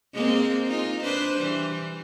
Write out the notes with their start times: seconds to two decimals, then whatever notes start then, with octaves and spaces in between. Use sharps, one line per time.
0.14 G#3 A#3 C4
0.67 D#4 F4
1.03 D4 B4 C5
1.38 E3 G3